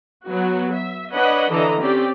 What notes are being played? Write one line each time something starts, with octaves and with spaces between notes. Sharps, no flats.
F#3 B3 F#4
E5
D4 B4 C#5 D#5 F#5 B5
D3 E3 D4 A4 D#5 A#5
C4 C#4 G4 D5